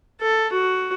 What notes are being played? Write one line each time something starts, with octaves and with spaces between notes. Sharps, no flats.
A4
F#4